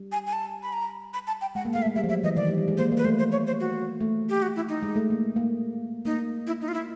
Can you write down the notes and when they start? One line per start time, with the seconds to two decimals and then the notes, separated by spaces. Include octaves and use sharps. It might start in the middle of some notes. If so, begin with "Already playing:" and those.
Already playing: G3
0.12 G#5
0.27 G#5
0.33 A5
0.63 B5
0.73 A#5
1.14 B5
1.27 A5
1.41 G5
1.55 G#3 F#5
1.65 A#3
1.73 A3 F5
1.82 E5
1.86 G#3
1.95 G3 E5
2.04 F3
2.09 F#3 E5
2.23 E3 D#5
2.36 D#3 D5
2.47 G3
2.58 G3
2.68 G#3
2.77 A#3 C5
2.92 A#3
2.97 B4
3.05 A3 C5
3.19 C5
3.32 C#5
3.47 C5
3.60 F#4
4.01 A3
4.30 G4
4.42 F#4
4.56 E4
4.69 D#4
4.83 G#3
4.96 A3
5.10 A#3
5.36 A#3
6.05 A#3 D#4
6.47 E4
6.61 D#4
6.68 F4
6.74 E4